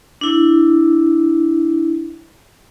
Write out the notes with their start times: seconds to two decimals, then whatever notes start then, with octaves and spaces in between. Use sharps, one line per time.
0.21 D4 E4